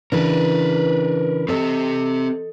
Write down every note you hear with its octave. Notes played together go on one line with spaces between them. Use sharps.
C#3 E3 D4 A#4 B4
C4 G4 A4 D#5